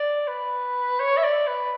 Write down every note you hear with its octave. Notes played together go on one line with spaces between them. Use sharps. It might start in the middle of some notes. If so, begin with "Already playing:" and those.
Already playing: D5
B4
C#5
E5
D5
B4